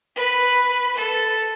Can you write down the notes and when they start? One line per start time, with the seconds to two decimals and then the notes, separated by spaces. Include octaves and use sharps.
0.16 B4
0.96 A4